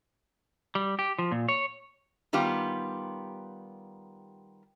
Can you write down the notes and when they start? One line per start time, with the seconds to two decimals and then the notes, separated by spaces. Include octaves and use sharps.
0.75 G3
0.99 G4
1.19 F3
1.32 A#2
1.49 C#5
2.33 D#3 G3 B3 F4 G4